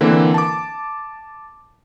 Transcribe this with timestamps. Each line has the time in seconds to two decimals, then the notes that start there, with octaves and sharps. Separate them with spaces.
0.01 D3 E3 A#3 C4
0.34 A5 D6